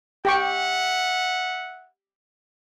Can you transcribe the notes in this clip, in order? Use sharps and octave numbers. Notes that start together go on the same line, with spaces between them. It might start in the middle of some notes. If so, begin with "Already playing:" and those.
G4 E5 F#5 G5 C#6